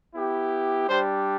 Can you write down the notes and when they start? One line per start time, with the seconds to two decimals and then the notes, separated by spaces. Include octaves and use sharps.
0.14 B3 E4 G4
0.88 G3 D4 G4 C5